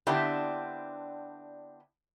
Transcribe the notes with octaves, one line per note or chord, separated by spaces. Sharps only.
D3 B3 C4 D4 E4 G4